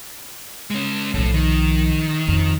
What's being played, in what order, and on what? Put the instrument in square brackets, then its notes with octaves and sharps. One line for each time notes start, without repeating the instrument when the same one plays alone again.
[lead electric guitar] G#3 C#4
[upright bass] B1 F3 [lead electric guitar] A2
[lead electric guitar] D#3
[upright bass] F2